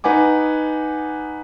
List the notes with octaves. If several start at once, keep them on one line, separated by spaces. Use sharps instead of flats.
D#4 B4 F#5 G#5 D6